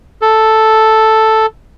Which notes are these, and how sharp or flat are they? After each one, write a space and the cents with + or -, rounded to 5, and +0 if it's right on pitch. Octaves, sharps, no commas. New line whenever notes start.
A4 +0